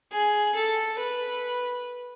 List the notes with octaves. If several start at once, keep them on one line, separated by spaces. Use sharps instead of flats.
G#4
A4
B4